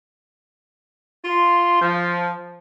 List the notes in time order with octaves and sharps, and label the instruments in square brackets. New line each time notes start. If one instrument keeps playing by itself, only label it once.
[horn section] F4 C6
F3